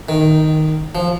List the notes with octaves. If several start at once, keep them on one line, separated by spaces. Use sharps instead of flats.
D#3
F3